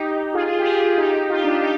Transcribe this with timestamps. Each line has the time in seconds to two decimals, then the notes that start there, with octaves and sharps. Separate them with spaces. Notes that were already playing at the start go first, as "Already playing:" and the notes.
Already playing: D#4 G4
0.34 F4 G#4
0.45 F4 G#4
0.59 G4
0.66 F4 G#4
0.98 D#4 G4
1.30 F4
1.37 G4
1.43 D4 F4
1.62 D#4 G4